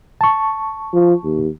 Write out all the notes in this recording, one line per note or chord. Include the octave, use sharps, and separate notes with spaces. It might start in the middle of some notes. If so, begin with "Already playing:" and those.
A5 C#6
F3
D#2